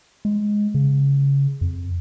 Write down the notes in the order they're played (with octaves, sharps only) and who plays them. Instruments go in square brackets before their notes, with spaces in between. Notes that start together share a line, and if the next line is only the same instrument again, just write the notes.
[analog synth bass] G#3
C#3
F2